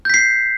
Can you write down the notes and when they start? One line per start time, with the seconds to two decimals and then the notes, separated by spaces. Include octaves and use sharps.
0.05 G6
0.10 B6
0.14 C7